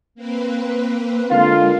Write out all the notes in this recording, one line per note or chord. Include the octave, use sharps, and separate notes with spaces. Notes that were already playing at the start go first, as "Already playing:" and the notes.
A#3 C4 B4
D3 G#3 A#3 F4